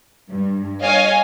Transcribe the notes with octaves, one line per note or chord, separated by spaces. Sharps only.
G2
C#5 D#5 F5 G#5